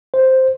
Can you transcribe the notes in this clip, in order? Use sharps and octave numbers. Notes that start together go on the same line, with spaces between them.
C5